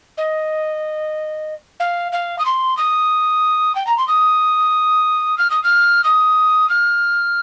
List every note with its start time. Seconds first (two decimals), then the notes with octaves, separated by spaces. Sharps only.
0.17 D#5
1.80 F5
2.12 F5
2.39 D#6
2.46 C6
2.77 D#6
3.75 G5
3.87 A#5
3.98 C6
4.08 D#6
5.38 F6
5.50 D#6
5.63 F6
6.04 D#6
6.69 F6